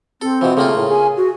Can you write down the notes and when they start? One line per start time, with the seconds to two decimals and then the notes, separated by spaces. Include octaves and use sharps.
0.22 C4 A4
0.41 B2 E3 F3
0.57 C#3 A3 A#3 F4
0.77 A2
0.91 G#4 G#5
1.17 F#4